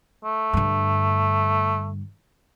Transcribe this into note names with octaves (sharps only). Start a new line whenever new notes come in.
A3
G2 D3